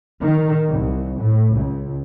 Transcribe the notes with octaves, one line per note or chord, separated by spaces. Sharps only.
D#3
C2
A2
C#2